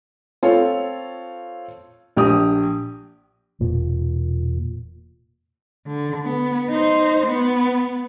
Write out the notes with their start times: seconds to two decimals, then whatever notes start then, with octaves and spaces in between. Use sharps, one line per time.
0.43 C4 F4 A4 C#5
2.17 A#1 G4 D#6
3.60 E1 A#2
5.87 D3
6.24 B3
6.69 D#4 C5
7.26 B3